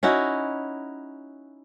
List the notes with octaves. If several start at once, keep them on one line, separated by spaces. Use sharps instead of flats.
C#4 D#4 E4 F#4